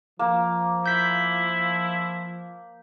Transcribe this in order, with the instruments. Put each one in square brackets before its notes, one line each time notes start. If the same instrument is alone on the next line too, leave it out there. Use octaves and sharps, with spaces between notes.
[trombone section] F3 [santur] A#3
[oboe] E4 [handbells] G6 B6